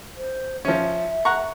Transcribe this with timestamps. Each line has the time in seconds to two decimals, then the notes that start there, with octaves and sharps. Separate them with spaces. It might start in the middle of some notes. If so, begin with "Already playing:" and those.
0.17 C5
0.65 F3 C#4 E5
1.25 F#5 A#5 C#6